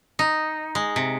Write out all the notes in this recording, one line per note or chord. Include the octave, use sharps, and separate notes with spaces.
D#4
G#3
C3